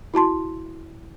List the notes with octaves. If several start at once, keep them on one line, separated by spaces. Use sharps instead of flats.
E4 F#4 A5 C6